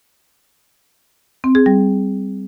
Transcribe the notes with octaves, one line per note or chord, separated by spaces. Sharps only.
C4
G#4
G3